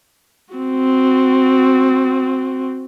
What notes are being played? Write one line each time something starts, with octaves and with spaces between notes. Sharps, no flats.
C4 F#4